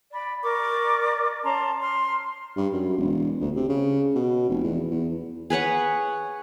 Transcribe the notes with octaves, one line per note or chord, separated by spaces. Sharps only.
D5 B5
A#4 D5 C#6 D6
C#4 A5 A#5 C6
C6 F6
G2
F#2
E1
D2
C3
C#3
B2
F1
E2
E2
G#4 B4 C#5 F#5